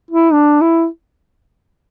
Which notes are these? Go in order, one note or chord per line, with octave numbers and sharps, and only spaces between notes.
E4
D4
E4